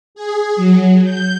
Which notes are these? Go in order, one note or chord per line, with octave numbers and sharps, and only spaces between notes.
G#4
F#3
G6